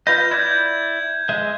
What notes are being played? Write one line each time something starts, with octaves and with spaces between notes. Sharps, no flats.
F4 B4 D#5 G6
E4 D5 G6 G#6
G#3 D#5 E5